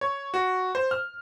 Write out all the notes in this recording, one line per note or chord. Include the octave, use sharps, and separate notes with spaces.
C#5
F#4
C5
F6